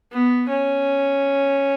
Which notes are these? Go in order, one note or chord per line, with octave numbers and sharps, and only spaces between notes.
B3
C#4